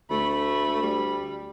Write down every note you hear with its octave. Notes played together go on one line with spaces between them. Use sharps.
D2 A3 B5
G3